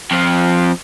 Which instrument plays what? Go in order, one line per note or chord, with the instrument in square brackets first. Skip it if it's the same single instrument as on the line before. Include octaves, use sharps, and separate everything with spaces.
[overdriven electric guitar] F2 F3